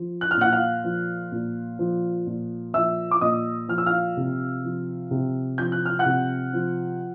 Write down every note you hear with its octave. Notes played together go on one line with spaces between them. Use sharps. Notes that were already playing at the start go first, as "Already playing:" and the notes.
Already playing: F3
F#6
F6
A#2 F#5 F#6
F5 F6
F3
A#2
F3
A#2
F3 E5 E6
D6
A#2 D#5 D#6
F3 F6
E6
F5 F6
C3
F3
C3
F3 G6
F#6
F6
F#5 F#6
C3
F3